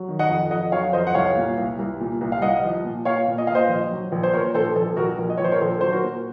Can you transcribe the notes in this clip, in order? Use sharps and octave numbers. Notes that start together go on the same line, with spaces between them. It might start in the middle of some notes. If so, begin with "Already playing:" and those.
Already playing: F#3
D#3
D#5 F#5
F2
F2 D#5 F#5
F#3 C#5 F5
F2 C5 D#5
F#5
C2 C#5 F5
A#2
C2
C2
A#2
C2
F5
C2 D#5 F#5
F3
A#2
A#2 C#5 F5
A#2
D#5
A#2 F5
C5 D#5
A#1
F#3
A#1
C5
A#2 A#4 C#5
A#1 A4 C5
A#1 A4
A#1 F#4 A#4
A#1
D#5
A#1 C#5
C5
A#4 C#5
A#1 A4 C5
F#3 C5
F#4 A#4
A#2